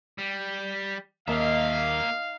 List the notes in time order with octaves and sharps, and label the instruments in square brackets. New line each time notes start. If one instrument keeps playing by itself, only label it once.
[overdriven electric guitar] G3
[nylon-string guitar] D#2 [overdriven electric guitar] A#3 E5 [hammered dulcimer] D#4 [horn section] F5